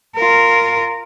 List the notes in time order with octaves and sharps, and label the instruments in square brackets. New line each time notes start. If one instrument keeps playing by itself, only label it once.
[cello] F4 A#4